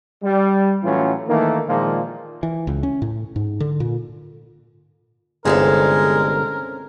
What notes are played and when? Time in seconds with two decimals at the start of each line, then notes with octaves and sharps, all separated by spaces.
0.23 G3
0.83 A2 E3 F#3 C#4 F4
1.28 D#3 E3 A3 A#3
1.67 A#2 D#3 F3 G#3 A#3
2.43 E3
2.67 C#2
2.83 C#4
3.02 A2
3.36 G#2
3.60 D3
3.80 A#2
5.45 G1 C2 G#3 C4 C#4 A4 A#4